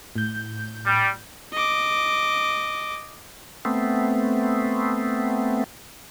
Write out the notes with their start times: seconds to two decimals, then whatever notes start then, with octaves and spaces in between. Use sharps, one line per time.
0.16 A2 G6
0.86 G3
1.53 D#5 D6
3.65 A3 B3 C4